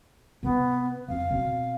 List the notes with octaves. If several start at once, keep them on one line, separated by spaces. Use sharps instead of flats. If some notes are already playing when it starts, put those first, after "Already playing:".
C3 B3
F2 F5
B2 C4